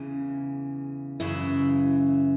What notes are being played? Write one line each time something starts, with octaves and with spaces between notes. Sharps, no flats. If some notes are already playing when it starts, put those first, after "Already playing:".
Already playing: E2 C#3 E3
F#2 C#3 E3 E4